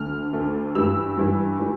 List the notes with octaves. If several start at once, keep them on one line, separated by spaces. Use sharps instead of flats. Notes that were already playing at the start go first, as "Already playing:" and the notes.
Already playing: D2 D3 A3 F6
D2 D3 A3
G2 E3 G3 E6
G2 E3 G3
E3 G3